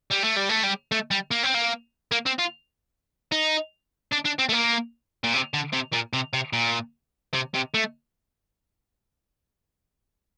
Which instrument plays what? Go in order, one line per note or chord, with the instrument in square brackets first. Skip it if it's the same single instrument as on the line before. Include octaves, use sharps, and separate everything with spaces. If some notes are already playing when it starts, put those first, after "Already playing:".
[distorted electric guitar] G3
A3
G3
A3
G3
A3
G3
A#3
C4
A#3
A#3
C4
F4
D#4
D4
D4
C4
A3
A#3
A#2
C3
D3
C3
A#2
C3
C3
A#2
C3
C3
A3